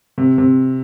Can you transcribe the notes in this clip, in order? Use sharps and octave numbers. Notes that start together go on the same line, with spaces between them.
C3
C3